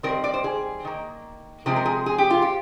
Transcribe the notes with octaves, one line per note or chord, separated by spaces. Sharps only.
D#3 G3 C4 A#4
D5
C5
G#4
D#3 A#3
C3 F3 G#3 C4 G#4
A#4
G#4
G#4
G4
F4
G4